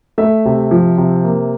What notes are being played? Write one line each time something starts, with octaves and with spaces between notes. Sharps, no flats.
A3 E5
C3
F3
C3
A#3